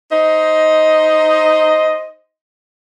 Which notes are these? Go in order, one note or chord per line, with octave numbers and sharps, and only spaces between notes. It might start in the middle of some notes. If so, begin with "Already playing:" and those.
D#4 C5 D#5